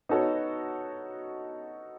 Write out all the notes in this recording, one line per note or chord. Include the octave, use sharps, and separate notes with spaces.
B3 D#4 F#4 A4 C#5